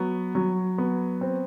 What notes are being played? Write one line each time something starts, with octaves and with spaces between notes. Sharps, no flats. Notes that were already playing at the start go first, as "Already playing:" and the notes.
Already playing: F#3 B3
F#3
B3
C4